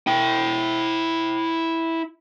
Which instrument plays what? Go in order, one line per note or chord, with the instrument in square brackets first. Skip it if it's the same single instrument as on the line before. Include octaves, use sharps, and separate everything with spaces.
[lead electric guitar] E4 G5